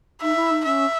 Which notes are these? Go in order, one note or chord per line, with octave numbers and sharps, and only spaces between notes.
D#4 E5
E4
D#4
C#4 E5